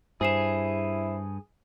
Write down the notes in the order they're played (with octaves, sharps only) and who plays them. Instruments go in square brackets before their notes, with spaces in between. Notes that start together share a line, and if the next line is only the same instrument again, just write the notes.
[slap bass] G2 [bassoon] E4 [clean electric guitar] G#4 [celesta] C5 C7 E7